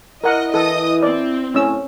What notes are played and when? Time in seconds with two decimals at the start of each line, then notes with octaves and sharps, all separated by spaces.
0.24 E4 A#4 D#5 F#5
0.54 E3 A4 D#5 D#6
1.02 C4 D5
1.54 A2 C#4 E6